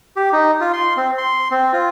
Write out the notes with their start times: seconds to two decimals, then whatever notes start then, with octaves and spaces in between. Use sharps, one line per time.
0.16 G4
0.33 D#4
0.61 F4
0.73 C6
0.97 C4
1.18 C6
1.51 C4
1.73 F4